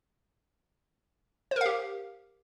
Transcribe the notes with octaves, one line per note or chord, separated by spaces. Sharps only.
G4 A#4 C5 F5